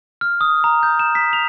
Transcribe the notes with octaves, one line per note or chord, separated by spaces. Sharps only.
F6
D#6
A#5
G6
E7
B6
F7